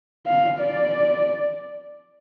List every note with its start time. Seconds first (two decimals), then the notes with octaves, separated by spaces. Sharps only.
0.26 F5
0.60 D5